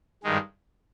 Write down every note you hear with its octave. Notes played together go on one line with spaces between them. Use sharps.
G2 D#3 G#3